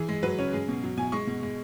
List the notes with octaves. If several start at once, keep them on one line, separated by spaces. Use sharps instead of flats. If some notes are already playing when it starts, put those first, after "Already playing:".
Already playing: E3 G#4
G#3
F#3 B4
C#3 C#5
G#3 G#4
B2
F#3
B2 G#5
G#3 C#6
B2
G#3